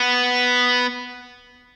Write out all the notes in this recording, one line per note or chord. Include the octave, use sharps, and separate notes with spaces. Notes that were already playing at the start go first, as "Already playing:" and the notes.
Already playing: B3